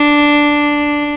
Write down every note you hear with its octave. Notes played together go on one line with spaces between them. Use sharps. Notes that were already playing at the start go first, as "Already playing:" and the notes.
Already playing: D4